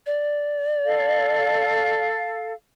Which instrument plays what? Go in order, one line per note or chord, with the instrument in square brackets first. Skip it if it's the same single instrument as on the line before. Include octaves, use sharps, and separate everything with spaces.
[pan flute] D5
[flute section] A4 F5